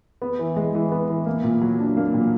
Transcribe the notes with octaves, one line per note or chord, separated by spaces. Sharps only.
B3
E3
G#3
E3
B3
E3
A#3
A#2
F#3
D4
A#3
A#2